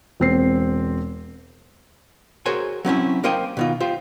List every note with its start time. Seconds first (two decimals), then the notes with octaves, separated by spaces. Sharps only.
0.20 E1 C4 C7
2.46 F#4 G#4 A#4 C5 C#5 G#5
2.85 F#3 C4 C#4 E4
3.24 A#3 A#4 C5 D#5 G5
3.57 B2 D#3 F4
3.80 F4 G4 C5